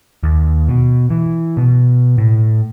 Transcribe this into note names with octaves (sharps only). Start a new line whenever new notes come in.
D#2
B2
E3
B2
A2